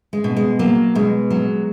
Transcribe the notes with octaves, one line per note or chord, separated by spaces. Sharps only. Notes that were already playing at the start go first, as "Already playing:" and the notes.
G#3
B2
G#3
F#3 A#3
B2 G#3
F#3